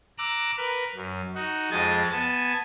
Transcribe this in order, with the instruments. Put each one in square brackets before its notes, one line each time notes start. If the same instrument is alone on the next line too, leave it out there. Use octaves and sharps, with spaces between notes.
[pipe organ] A#5 D6 E6 F#6
A#4 B4
F#2
D#4 F#4
F2 G#3 D#5 G#5 A6
B3 G#5 A5